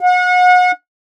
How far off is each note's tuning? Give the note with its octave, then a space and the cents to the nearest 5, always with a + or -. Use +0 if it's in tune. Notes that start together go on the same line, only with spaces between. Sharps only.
F#5 -35